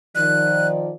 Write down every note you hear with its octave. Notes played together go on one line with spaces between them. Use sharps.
D#3 F3 D5 F#6